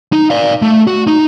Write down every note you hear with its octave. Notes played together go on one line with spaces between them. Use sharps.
D#4
D5 F5
A3
F#4
D#4